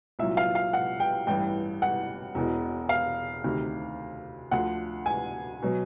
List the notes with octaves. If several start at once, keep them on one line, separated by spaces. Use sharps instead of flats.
C2 A#2 F#3 E5
F5
F5
F#5
G5
A1 G2 E3 G5
F#5
E1 E2 B2
F5
D2 C3 D#3
D2 D3 F3 F#5
G#5
B2 F#3